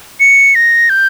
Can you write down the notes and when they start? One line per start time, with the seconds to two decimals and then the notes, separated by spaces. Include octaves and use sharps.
0.20 C#7
0.55 A#6
0.90 G6